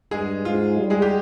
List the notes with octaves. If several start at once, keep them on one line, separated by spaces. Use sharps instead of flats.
G2 G#3 G#4
G#2 F4
G3
G#3 G#4
G4